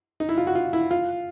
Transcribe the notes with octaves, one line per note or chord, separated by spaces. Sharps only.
D#4
E4
F4
F#4
F4
E4
F4